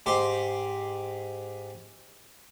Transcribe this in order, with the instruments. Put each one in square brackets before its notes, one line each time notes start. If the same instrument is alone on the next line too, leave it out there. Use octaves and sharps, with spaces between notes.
[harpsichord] G#2 G4 C6